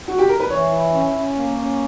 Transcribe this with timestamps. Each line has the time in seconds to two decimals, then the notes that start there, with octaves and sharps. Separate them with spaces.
0.08 F#4
0.18 G4
0.29 A#4
0.40 B4
0.50 E3 C#5
0.72 E4
0.93 C#4
1.15 C#4
1.36 A#3
1.56 C#4